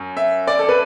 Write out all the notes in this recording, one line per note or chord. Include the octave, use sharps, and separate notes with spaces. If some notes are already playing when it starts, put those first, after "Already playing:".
Already playing: F#2
E5
D5
A4
B4